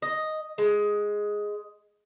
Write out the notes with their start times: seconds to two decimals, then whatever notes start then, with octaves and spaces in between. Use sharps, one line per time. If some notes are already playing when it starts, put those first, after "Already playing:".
0.02 D#5
0.58 G#3